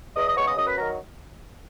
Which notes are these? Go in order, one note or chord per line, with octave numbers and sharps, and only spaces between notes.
E2 D#5 D#6
D#5 D#6
C#3 G#3 B3 C#5 C#6
D#5 D#6
F#2 D#5 D#6
B4 B5
D#3 F#3 A#4 A#5